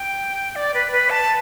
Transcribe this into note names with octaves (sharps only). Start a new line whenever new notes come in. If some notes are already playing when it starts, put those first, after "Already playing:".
Already playing: G5
D5
B4
B4
A5